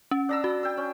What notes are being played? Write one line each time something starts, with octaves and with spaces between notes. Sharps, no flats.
C#4
D4 A#5 E6
F#4
G5 E6
C#4